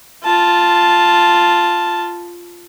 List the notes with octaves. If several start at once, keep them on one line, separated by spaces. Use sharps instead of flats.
F4 A5